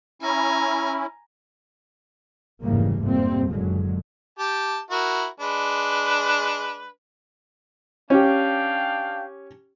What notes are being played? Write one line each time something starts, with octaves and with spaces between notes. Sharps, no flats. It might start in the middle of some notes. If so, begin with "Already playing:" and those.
C#4 E4 G#5 A#5
F1 G#2 C#3 E3 G3 A#3
F2 G#2 C3 G3 A#3 C4
F#1 F#2 A#2 D3 F#3 G#3
G4 A5
E4 F#4 A#4
G#3 D4 B4
C#4 D4 G4 F5 G5